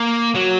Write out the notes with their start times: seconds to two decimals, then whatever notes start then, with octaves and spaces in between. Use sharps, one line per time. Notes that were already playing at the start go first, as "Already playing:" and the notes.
Already playing: A#3
0.35 F#3